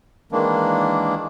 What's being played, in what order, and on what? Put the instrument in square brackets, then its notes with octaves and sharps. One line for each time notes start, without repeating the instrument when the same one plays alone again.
[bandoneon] D#3 E3 G#3 A#3 D4